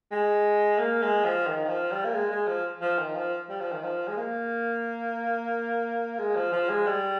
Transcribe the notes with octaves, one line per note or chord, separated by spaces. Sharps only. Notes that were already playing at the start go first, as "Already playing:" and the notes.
G#3
A#3
G#3
F3
D#3
D#3
F3
G3
A#3
G#3
G#3
F3
F3
D#3
F3
G3
F3
D#3
F3
G#3
A#3
G#3
F3
F3
G#3
G3